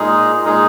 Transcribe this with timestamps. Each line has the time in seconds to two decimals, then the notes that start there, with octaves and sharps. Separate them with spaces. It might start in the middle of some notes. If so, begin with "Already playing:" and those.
Already playing: A#2 G#3 D#4 G#4
0.43 A#2 G#3 D#4 G#4